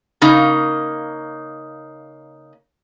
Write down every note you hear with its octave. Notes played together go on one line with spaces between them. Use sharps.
C#3 A#3 D#4